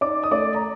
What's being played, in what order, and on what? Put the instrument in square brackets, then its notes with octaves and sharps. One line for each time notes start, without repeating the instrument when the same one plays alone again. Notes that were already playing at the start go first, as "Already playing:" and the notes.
[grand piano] D#4 D5 D6
D#6
A3 D5 D6
A#5